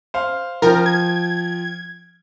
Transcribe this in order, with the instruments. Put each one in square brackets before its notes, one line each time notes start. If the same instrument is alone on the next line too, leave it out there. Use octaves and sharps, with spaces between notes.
[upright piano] C5 F5
[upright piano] F3 G5 [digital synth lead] A#4
[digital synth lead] G#6